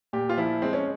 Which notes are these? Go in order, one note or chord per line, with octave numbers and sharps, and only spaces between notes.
A#2 G4
F4
F3 E4
G#3 C4
C#4